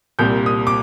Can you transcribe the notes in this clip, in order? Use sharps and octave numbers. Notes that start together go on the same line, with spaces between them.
C2 A#2 G3 G6
D#6
D6